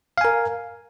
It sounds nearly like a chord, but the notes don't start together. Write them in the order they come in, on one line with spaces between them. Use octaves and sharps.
F5 G#5 A#4